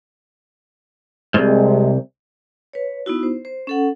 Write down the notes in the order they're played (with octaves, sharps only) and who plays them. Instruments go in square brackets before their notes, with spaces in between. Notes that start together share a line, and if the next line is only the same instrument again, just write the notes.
[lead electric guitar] C2 G#2 [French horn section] C3 G#3
[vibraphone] B4 C#5
B3 D#4 E4 F#4
C5
C5
C#4 A4 F#5